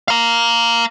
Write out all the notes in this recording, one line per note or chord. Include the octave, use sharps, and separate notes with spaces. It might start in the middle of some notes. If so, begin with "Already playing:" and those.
F5 A#5